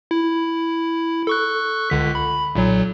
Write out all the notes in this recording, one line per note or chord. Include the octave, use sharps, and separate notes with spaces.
E4
A4 C#6 F#6
C#2 D3 B6
B5
B1 A#2 F#3